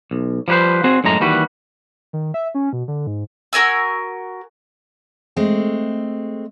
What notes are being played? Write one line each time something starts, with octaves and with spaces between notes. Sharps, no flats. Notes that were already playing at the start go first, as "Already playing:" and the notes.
B1
F3 G3 G4 B4 C5
C4 F#4 G#4
F#2 A2 G#3 A#5
D#2 E3 G3 F#4 B4
D#3
E5
C#4
B2
D3
G#2
F#4 A#4 G#5 E6
G#3 A3 C4